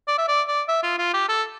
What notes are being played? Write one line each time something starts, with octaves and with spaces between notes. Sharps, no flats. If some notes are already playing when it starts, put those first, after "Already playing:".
D5
E5
D5
D5
E5
F4
F4
G4
A4